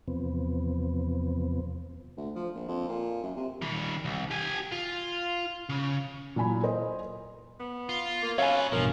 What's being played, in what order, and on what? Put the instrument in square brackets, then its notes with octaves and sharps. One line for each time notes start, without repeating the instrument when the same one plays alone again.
[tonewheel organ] E2 C3 F3 B3 C4
[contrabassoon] D2
F3
A#1
F2
A#2
F#2
C3
[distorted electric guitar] D#3 G3
C2
G4 G#5
F4
C#3
[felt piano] A#2 F#3 E4 G#5 B5
A#4 C5 D#5
[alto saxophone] B3
[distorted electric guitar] F4
[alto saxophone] A#3
[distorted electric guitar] F#3 B4 [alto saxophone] C#4 [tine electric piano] C#5 G#5 [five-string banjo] F5
[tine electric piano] A1 G2 B2 [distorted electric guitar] F3 [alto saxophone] A#4